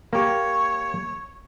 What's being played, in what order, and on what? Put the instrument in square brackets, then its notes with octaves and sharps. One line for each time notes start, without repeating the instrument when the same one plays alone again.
[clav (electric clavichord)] A#3 G4 [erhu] C#5